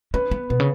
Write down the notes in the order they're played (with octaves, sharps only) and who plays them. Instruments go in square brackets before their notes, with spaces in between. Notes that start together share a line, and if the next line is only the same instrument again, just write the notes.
[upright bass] C#4 [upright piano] B4
[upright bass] B3
[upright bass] B2 [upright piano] B3
[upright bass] C#3